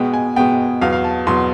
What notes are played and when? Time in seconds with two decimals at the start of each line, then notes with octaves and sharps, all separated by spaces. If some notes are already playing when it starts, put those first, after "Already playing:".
Already playing: B2 G#3 B3 G5
0.14 G#5
0.36 B2 G#3 B3 G5
0.81 E2 B2 F#3 F5
0.93 F5
1.04 A5
1.27 E2 B2 F#3 C6